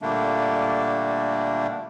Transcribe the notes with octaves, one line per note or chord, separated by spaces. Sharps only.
A#2 D3 G3 A3 A#3 D4